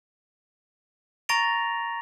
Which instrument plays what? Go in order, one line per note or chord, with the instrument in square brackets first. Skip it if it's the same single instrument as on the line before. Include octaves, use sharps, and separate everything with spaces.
[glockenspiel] A#5 C#6 A6 A#6 D7 F7